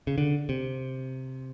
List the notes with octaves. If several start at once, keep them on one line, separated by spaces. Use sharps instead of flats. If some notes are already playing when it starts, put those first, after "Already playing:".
C#3
D3
C3